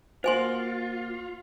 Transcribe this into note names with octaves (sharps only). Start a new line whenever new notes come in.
A#3 F4 F#4 C5 G#5 C6